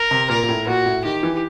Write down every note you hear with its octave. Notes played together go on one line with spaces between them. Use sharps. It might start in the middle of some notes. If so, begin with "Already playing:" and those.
Already playing: A#4
C3
A#2 A#4
A#2
A2
A#2 F#4
A2
D#3 G4
E3